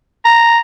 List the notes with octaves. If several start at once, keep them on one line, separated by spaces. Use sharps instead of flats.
A#5